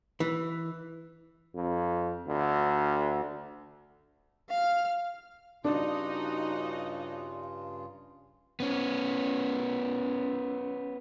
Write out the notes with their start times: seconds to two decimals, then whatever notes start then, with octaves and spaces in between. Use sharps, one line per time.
0.20 E3
1.55 F2
2.27 D2
4.49 F5 F6
5.65 G2 C#3 D4 D#4 F4 F#4 D#5
8.60 B3 C#4